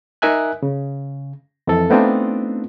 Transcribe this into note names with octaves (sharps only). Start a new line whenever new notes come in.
D#4 A#4 E5 G#5 F#6
C#3
F2 E3 A4
A3 B3 C4 D4 D#4 F4